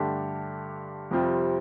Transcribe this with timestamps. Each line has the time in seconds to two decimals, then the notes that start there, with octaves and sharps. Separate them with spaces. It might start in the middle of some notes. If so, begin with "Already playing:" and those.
Already playing: G2 D3 A3 D4 G4
1.11 F2 C3 G3 C4 F4